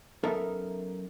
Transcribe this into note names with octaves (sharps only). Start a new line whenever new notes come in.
F#2 B3 D#4 A4 A#4 E5